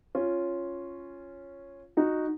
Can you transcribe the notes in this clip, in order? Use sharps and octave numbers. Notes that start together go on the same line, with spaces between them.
C#4 F4
D#4 F#4